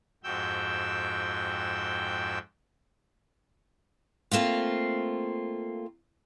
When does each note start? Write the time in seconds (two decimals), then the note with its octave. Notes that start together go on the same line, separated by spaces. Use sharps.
0.24 F2 G#2 F#4 G5 E6 G6
4.31 A3 A#3 C4 F4